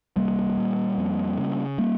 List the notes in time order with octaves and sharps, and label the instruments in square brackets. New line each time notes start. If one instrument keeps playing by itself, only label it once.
[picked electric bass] C2 G3 A#3
A#2
F2
C#3
G3 A#3